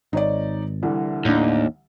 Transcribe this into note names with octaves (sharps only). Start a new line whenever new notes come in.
G#1 D#4 C#5 D5
C2 D3 E3
D#2 A2 D4